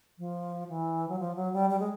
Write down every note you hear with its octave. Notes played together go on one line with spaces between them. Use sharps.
F3
E3
F#3
F3
F#3
G3
G3
G#3